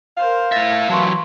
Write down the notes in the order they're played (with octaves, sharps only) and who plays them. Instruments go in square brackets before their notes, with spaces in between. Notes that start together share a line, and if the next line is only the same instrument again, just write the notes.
[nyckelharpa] A#4 C5 [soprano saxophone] F5
[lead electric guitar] A2 E5 [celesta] A6 A#6
[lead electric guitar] E3 F#3 [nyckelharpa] B4 [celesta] A5 C6 C#6